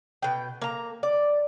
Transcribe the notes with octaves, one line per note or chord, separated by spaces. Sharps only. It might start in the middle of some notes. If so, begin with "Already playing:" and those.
B2 G5
A#3 A#5
D5